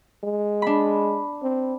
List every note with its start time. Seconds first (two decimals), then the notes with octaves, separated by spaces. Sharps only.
0.24 G#3
0.62 D4 B5
1.42 C4